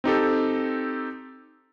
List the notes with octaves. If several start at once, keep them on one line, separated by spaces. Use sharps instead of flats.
C4 D#4 G4 A4